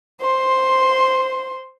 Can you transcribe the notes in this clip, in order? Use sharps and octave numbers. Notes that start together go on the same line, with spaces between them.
C5 C6